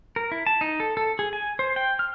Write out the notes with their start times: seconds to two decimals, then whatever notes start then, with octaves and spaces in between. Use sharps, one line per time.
0.16 A#4
0.32 E4
0.47 A5
0.61 D#4
0.80 A4
0.97 A4
1.19 G#4
1.33 G#5
1.59 C5
1.76 G5
1.99 F6